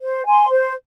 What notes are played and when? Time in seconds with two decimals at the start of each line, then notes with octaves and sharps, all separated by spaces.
0.02 C5
0.25 G#5 C6
0.50 C5